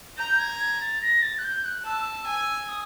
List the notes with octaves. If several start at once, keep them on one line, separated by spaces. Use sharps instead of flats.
A#5 G6
G#6
G#6
A6
A#6
A6
F#6
G6
F#6
A5 E6
G#5 E6
D#6